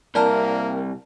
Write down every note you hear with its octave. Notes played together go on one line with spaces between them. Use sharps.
C2 A#3 A#4 D5 A5 A#5